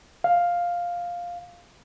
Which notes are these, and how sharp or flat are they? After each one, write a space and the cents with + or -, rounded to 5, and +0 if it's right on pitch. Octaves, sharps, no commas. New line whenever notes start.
F5 +5